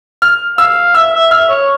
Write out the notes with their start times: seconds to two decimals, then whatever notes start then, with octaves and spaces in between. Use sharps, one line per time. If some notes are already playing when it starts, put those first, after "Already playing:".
0.22 F6
0.58 F5 E6
0.95 E5 E6
1.13 E5
1.31 E5 F6
1.49 C#5